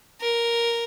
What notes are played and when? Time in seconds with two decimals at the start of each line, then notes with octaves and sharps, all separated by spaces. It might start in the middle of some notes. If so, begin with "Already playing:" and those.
0.21 A#4